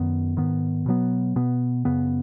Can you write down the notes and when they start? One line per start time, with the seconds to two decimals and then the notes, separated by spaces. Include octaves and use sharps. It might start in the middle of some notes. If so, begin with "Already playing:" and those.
Already playing: F#2 D#3 B3
0.37 G#2 D#3 B3
0.86 B2 F#3 B3
1.36 B2 B3
1.85 F#2 C#3 B3